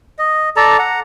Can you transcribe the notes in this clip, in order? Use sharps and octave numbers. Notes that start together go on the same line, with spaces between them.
D#5
A4 D5 A5 A#5
F#5 A#5